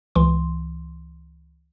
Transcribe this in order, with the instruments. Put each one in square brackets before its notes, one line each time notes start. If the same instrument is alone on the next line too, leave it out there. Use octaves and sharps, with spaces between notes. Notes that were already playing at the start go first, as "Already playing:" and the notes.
[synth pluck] C#2 E3 C6